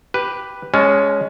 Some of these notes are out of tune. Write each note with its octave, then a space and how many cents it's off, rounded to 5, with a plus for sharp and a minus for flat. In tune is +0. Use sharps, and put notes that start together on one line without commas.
G4 +0 B4 +0
G#3 +0 C#4 +10 A5 -30